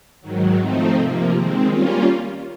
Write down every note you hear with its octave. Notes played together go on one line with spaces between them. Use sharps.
G#2 D#3 F#3
F3 A3 C4 D#4
C3 F3 A#3
D#3 G#3 C4
G3 A#3 C#4 F4